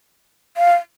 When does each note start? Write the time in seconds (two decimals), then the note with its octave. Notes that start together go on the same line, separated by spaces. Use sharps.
0.57 F5